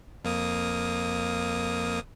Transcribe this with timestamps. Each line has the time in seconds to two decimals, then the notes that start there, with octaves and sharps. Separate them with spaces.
0.25 F2 A#3 D#6